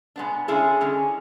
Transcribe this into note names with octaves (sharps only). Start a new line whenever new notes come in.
B2 G#3 B3 D4
D3 G#3 C#4 E4 G#4
D3 G#3 C#4